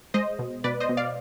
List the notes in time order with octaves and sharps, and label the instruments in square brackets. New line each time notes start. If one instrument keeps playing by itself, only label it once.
[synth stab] G#3 C5 D#5
B2
B2 B4 D5
C5 D#5
B2
D5 F5